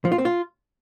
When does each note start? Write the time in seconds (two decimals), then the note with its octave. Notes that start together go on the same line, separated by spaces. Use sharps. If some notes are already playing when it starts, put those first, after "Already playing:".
0.05 F3
0.12 F4
0.18 C4
0.25 F4